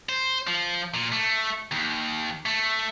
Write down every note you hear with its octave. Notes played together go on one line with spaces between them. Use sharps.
C5
F3
A#2
A3
D#2
A3